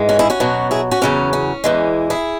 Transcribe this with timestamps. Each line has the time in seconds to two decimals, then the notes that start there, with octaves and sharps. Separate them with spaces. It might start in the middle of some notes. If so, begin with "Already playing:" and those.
Already playing: G#2 E3 G#3
0.09 C#4 F#4
0.19 E4 G#4
0.30 C#4 F#4
0.40 B2 F#3
0.71 E4 G#4
0.91 C#4 F#4
1.02 E2 C#3 F#3 C#4
1.33 C#4
1.64 E2 E3 G#3
2.10 E4 G#4